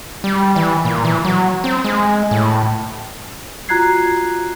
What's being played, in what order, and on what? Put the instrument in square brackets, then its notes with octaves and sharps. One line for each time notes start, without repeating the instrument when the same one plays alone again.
[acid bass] G3
E3
A#2
E3
F#3
C4
G#3
A2
[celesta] F4 F#4 A#5 F#6 G#6 C7